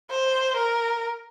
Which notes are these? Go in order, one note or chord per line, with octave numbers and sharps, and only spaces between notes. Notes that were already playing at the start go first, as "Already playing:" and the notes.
C5
A#4